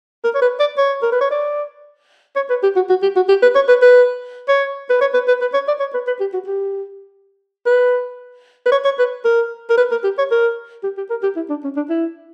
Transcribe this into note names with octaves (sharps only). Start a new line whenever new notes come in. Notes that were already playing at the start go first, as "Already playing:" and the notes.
A#4
C#5
B4
D5
C#5
A#4
B4
C#5
D5
C#5
B4
G4
F#4
F#4
G4
F#4
G4
B4
C#5
B4
B4
C#5
B4
C#5
B4
B4
B4
C#5
D5
C#5
B4
B4
G4
F#4
G4
B4
B4
C#5
C#5
B4
A#4
A#4
B4
A#4
G4
C#5
A#4
G4
G4
A#4
G4
E4
D4
C#4
D4
E4